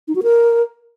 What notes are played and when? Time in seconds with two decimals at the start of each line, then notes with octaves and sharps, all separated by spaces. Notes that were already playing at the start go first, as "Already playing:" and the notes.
0.08 D#4
0.15 F#4
0.23 A#4